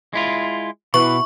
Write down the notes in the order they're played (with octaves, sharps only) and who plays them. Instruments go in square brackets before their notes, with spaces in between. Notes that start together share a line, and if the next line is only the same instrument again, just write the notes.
[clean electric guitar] G#3 E4 F4
[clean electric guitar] B2 [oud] E3 [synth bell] C#6